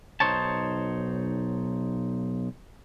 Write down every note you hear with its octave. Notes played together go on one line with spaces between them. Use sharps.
B1 D#4 C5 C#5 A5